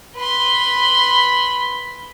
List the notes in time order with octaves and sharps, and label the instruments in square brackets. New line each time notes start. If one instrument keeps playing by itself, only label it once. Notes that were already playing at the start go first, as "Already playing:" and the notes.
[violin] B4 C6 [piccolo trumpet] B5